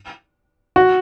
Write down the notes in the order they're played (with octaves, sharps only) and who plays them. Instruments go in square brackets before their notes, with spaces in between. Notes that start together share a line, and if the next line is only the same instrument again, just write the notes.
[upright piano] F#4